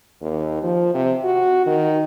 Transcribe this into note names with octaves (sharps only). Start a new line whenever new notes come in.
D#2
F3
C3
F#4
D#3